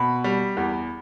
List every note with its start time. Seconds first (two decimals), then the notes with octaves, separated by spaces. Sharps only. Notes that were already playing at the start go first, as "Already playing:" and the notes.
Already playing: B2 B5
0.24 G3
0.57 E2